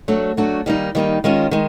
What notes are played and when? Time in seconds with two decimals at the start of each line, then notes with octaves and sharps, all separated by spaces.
0.08 F#3 A3 D4 F#4
0.37 F#3 A3 D4 F#4
0.66 D#3 G3 A#3 D#4
0.95 D#3 G3 A#3 D#4
1.24 D#3 G#3 C#4 F4
1.51 D#3 G#3